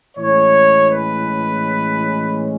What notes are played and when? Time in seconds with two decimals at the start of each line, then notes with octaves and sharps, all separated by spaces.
0.17 A2 E3 G#3 C#4 C#5
0.89 B4